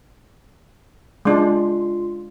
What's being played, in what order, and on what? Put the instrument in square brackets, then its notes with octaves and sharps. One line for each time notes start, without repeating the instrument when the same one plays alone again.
[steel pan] G#3 D4 [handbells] F4 C6